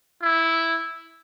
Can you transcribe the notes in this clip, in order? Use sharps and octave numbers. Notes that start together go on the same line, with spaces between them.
E4